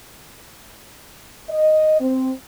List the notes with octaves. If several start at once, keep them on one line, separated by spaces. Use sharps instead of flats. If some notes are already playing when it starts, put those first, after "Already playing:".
D#5
C4